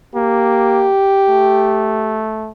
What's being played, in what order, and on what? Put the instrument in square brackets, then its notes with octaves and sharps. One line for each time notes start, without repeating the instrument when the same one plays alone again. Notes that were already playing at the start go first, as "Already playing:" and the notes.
[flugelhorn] A#3 [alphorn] G4
[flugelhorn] A3